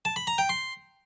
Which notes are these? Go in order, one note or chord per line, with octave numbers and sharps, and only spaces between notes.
A5
B5
A#5
G5
C6